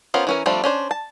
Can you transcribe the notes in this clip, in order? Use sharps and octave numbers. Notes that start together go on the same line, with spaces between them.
B3 C#4 F4 A#4 C5
E3 C#4 A#4
F3 G3 A3 C4 D4
C#4 D4 C5
A5